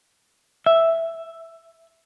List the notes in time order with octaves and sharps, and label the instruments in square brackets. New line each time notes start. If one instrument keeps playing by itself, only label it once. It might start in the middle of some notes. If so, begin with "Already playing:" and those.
[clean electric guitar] E5